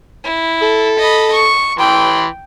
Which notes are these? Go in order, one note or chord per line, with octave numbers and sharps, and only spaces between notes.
E4
A4
D#5 B5
C#6
E3 B4 G5 C6